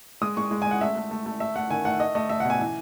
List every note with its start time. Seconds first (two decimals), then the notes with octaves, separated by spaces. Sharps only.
0.21 G#3 D#6
0.37 G#3 C#6
0.51 G#3
0.62 G#5
0.66 G#3
0.71 F#5
0.81 A3 E5
0.96 A3
1.11 A3
1.26 A3
1.40 A3 E5
1.56 A3 F#5
1.70 D#3 G#5
1.85 A3 F#5
2.00 A3 D#5
2.15 A3 D#5
2.29 A3 E5
2.40 F#5
2.45 B2
2.50 G#5
2.60 E3